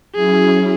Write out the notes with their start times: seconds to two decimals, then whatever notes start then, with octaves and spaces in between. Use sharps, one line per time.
0.15 F#3 C#4 E4 G#4